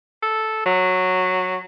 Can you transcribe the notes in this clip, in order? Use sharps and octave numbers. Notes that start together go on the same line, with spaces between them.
A4
F#3